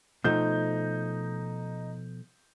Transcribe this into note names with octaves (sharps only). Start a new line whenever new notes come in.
B2 F3 A3 D#4 G6